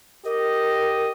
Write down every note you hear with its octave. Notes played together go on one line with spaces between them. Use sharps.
G4 A#4 D#5